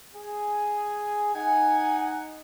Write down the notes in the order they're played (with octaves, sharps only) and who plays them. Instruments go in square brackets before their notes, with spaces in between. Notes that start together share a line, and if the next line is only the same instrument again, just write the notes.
[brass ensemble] G#4
[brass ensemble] D#4 F#5 [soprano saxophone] G#5